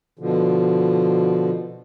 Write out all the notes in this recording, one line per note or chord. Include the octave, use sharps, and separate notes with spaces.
B2 D3 F3